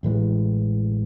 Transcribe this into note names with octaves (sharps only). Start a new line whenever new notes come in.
A1 A2 E3 G#3